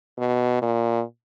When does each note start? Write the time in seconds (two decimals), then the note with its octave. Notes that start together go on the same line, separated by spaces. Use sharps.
0.18 B2
0.62 A#2